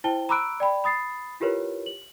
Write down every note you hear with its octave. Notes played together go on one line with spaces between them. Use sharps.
E4 C5 G5 A5 G7
A#5 B5 D6 E6 F#6 D7
D5 G5 B5
B5 D#6 A6 C7
E4 F4 G4 A#4 B4 C#5
F#7